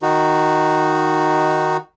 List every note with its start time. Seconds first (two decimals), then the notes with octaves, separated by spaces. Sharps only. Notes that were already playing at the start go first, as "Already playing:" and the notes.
0.02 D#3 D#4 F#4